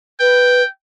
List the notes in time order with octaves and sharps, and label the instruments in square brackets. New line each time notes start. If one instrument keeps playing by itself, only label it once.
[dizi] B4 [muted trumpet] G5